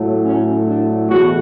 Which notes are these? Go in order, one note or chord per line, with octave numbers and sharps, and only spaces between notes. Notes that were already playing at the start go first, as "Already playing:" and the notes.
Already playing: A2 F#3 A3
C#4
D4
E2 B2 A3 F#4